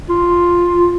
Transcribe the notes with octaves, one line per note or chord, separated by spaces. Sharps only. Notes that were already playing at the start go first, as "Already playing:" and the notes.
F4